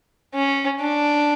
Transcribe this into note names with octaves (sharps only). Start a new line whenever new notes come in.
C#4
D4